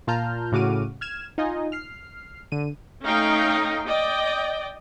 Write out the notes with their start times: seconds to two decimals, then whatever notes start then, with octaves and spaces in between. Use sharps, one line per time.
0.07 A#2 F4 A5 A#5 F6 G6
0.52 A2 C#3 F#4 D6 F6 D#7
1.01 F6 G#6 E7
1.38 D#4 F4 D#5 G#5
1.72 F6 C7
2.52 D3 D#7
3.04 A3 C#4 D#4 F5 G5
3.87 D5 D#5 G5